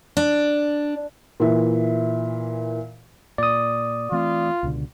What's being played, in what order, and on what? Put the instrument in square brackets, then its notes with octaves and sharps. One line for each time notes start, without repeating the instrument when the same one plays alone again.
[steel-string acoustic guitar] D4
[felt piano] A#2 E3 E5
[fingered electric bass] A#2 [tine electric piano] D5 D#6
[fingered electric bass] E3 A3 C4 [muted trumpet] F4
[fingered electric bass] C#2 B2 D3